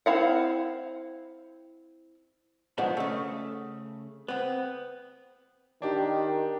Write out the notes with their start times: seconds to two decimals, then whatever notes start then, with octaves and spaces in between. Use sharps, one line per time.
0.06 C4 E4 F5 F#5
2.78 B2 D#3 F3 G#3 B3 D4
2.97 C#3 A3
4.28 B3 C4
5.82 D#3 D4 G4